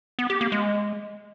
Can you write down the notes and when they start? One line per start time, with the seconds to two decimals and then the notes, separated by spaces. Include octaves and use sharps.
0.19 B3
0.30 G4
0.41 A#3
0.52 G#3